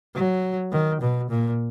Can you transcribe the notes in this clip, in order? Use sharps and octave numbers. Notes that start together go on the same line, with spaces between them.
F#3
D#3
B2
A#2